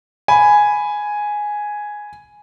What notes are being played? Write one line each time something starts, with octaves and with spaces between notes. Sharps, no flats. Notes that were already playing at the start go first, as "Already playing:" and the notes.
G#5 B5